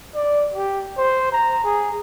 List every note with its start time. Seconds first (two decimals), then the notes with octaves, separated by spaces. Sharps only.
0.15 D5
0.54 G4
0.98 C5
1.32 A#5
1.64 G#4